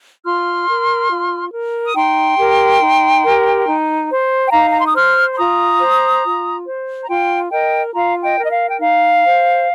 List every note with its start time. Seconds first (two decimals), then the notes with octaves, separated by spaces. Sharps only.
0.24 F4 C6 F6
0.68 A#4
1.11 F4
1.52 A#4
1.86 D#6
1.95 D#4 G5 C6
2.39 G4 A#4
2.81 D#4
3.25 G4 A#4
3.67 D#4
4.10 C5
4.48 G5
4.52 D#4 F5 A#5
4.72 A#5
4.80 C6
4.88 D#6
4.95 C5 C6 F6
5.33 C6
5.37 F4 A#5 D#6
5.80 C5
6.24 F4
6.66 C5
7.03 A#5
7.09 F4 G5 C6
7.51 A#4 D#5 G5
7.94 F4 F5 A#5
8.23 D#5 G5
8.37 A#4
8.44 D#5
8.51 F5
8.69 G5
8.79 D#4 F5
9.23 C5